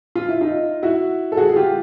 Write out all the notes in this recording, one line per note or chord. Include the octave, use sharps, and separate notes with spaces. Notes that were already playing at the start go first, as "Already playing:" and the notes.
F4
E4
D#4 F4
E4 F#4
A4
F#4 G#4
G#4
F4 G4